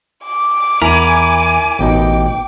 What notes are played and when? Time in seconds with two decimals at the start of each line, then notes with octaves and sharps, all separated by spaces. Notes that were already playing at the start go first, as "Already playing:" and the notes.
0.24 D6
0.82 E2 E4 A#4 G#5
1.79 A1 B2 D#4 G5